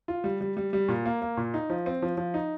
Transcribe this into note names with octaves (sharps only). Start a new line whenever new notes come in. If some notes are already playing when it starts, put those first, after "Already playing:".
F4
G3
G3
G3
G3
A#2
A#3
A#3
A#2
D#4
F3
C4
F3
F3
D#4